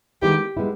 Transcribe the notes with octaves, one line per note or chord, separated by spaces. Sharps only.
D#3 G#3 B3 E4 G4
G#3 B3 E4